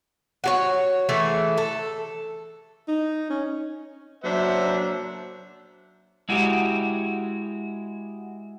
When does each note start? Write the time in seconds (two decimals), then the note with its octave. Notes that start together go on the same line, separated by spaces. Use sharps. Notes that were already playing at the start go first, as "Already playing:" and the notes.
0.44 F#4 G4 C#5
1.09 E3 A3 G#4 A4
1.58 A4
2.88 D#4
3.30 C#4
4.24 F#3 A#3 D4 C5 E5 F#5
6.29 G#3 E4 F#4 G4